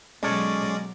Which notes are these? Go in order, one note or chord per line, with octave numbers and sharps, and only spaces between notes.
B2 F#3 G#3 C#4 A4 C#5 D5